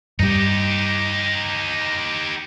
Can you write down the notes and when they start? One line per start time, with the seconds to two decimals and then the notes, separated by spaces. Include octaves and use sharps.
0.19 G2 G3 D#4 G4